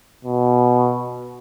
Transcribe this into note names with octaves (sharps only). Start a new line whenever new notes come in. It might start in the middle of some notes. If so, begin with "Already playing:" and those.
B2